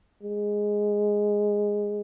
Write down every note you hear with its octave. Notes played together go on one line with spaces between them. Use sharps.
G#3